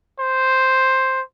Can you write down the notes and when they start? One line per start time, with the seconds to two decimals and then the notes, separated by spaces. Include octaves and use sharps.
0.20 C5